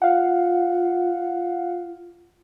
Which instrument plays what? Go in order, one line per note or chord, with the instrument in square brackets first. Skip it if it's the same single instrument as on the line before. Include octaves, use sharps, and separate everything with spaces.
[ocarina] F4 [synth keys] F5 F#5